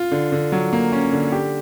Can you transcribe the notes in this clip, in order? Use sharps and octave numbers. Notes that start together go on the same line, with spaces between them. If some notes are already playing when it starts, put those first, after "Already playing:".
Already playing: F4
D3
D3
F#3
A#3
C#4
D3
G4